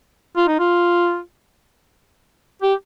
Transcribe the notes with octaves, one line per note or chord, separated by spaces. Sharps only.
F4
D#4
F4
G4